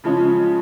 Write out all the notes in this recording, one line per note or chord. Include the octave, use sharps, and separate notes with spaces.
C#3 F3 G#3 C#4